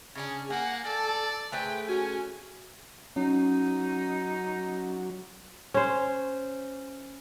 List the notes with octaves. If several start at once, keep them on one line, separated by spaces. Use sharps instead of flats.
C#3 C#4 D4 G#4
A#3 F#5 G#5
A4 D5
A3 G#4 B4 C5 G5
C#4 F#4 G#5
F#3 C#4 D#4
C#4 C5